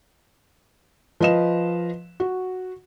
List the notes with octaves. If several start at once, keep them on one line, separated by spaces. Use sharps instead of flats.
F3 B4 D#5 F5 E7
F#4